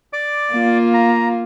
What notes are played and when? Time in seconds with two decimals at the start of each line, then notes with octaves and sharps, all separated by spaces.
0.13 D5 D6
0.52 A#3 F4
0.94 A#5